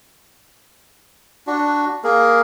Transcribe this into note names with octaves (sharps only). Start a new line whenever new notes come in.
D4 F#4
A#3 G#4 A#4